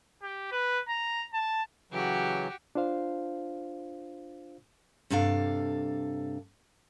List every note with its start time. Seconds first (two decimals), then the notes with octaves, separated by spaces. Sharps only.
0.22 G4
0.52 B4
0.89 A#5
1.34 A5
1.92 C#3 E3 F#3 F#4 G4
2.75 D4 F4 C5 F5
5.10 G2 C3 D4 A4 F5